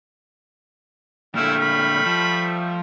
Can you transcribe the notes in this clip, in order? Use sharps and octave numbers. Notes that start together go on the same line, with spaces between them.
A#2 D3 G3 A3 E4 F6
B5
F3